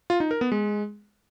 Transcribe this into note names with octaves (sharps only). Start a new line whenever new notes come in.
F4
D#4
A#4
B3
G#3